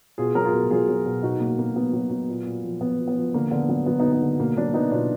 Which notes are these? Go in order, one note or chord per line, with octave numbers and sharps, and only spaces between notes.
B2 F4 G#4
F#3 A#4
F4 G#4
B2
F#3 F4 G#4
F#3
B2
B2 D#4 F#4
B2 A#3
B2 A#3
F#3 B3
F#3
F#3
A#2
A#2
F3
F3 B3
F3
B3
F3
D3 A#3
D3 B3
F#3 B3
F#3 B3
D3 B3 D#4
B3
D3
B2 A#3
F#3 A#3 D4
F#3 B3 D#4
B2 D4 F4